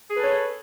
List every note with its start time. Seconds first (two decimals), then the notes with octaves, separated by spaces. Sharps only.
0.08 G#4
0.13 B4
0.18 A4
0.23 C#5